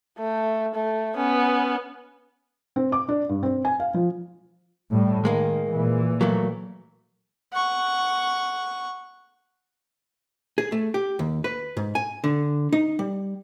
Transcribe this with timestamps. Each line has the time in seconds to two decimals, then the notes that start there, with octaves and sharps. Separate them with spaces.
0.18 A3
0.75 A3
1.15 B3 C#4
2.76 C4
2.92 D6
3.09 D4
3.29 G2
3.43 C4
3.65 G#5
3.80 F5
3.94 F3
4.91 A2 G3
5.25 D#3 G#3 A#3
5.71 A#2 E3
6.21 F#3 A3 A#3
7.53 F#5 C#6
10.58 G#4
10.72 A3
10.94 G4
11.19 D#2
11.44 B4
11.77 G#2
11.95 G#5
12.24 D3
12.72 D#4
12.99 G3